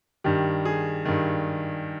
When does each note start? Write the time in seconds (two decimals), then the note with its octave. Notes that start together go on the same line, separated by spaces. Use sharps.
0.24 G2 D#3 G4
0.65 G#4
1.05 G2 D#3